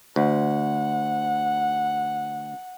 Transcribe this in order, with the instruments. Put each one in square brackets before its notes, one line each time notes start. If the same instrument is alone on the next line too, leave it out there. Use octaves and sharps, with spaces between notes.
[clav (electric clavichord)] D2 [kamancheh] F#5